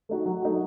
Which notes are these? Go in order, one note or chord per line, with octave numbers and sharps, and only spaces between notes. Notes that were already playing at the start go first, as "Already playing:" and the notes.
A3 D#4 F#4
F#3
A3 D#4 F#4